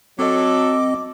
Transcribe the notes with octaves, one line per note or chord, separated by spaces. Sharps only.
F#3 C4 A4 D#5 D6